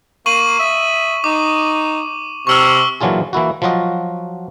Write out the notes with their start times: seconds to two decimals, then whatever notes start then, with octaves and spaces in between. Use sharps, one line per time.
0.26 A#3 C#6 D#7 F#7
0.58 D#5 E5
1.24 D#4 D6
2.47 C3 C#6 E6 F6
3.01 A#2 E3 F#3 D4 F4 G#4
3.33 E3 A#3 E4 F#4
3.62 F3 F#3 F4 F#4 D#5